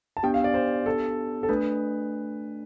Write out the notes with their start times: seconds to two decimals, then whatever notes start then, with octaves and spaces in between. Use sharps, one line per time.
0.17 A5
0.23 B3 D4 G4 G5
0.34 F5
0.44 D5
0.54 C5
0.86 A4
1.43 A4
1.49 A3 D4 B4